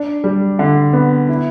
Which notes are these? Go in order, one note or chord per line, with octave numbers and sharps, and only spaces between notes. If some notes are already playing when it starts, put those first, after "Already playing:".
Already playing: D4
G3
D3
B3
E4